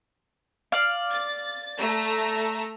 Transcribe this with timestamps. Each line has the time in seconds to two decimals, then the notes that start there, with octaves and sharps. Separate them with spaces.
0.72 D5 F5
1.13 A6
1.80 A3 A#5 E6